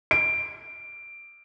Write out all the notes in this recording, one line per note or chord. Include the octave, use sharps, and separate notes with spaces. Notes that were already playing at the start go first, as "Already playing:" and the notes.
D7